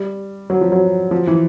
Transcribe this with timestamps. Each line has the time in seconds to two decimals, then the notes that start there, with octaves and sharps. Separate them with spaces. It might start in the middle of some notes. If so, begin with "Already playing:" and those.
Already playing: G3
0.50 F#3
0.61 F3
0.72 F#3
1.11 F3
1.27 E3